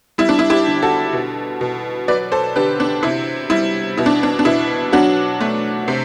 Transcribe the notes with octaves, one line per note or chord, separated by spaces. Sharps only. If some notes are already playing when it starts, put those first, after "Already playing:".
G3 E4
D4
E4
E4 G4
D3
F#4 A4
B2
B2
F#3 B4 D5
A4 C5
D3 G4 B4
D4
C3 E4
G3 E4
B2 E4
D4
D4
D4
B2 E4
F#3 D4 F#4
A3
C3